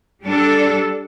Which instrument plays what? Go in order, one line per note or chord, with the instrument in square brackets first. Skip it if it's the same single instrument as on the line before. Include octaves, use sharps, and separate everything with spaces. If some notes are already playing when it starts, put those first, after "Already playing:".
[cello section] G3 D4 A4